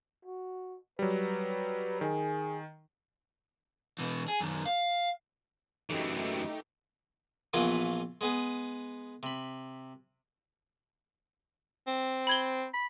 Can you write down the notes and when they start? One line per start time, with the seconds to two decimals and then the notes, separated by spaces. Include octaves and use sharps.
0.25 F#4
0.99 F#3 G3 B4
2.01 D#3 G#4
3.99 B2 E3
4.28 G#4
4.40 F#2 D#3
4.66 F5
5.90 F#2 E3 A3 D#4 G4
7.53 A#1 E3 B3 C#4 F4 A#4
8.21 G#3 B3 G#4
9.23 C3 B5
11.87 C4
12.27 B5 G#6 G7
12.74 B5